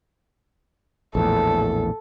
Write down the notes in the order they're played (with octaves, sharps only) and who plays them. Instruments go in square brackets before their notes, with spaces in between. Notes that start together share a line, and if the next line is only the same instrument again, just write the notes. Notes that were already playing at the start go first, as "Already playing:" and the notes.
[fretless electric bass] A#1 E2 A2 [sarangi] A4